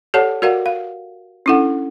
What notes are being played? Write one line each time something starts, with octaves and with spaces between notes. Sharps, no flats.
G4 A4 C#5 D5 F#5 A5
F#4 A#4 D5 F5 F#5
F5
C#4 D4 E4 A4 F#5